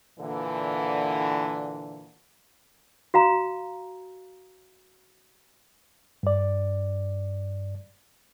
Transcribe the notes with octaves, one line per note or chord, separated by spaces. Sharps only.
A#2 D3 E3
F#4 F5 A#5
G2 D5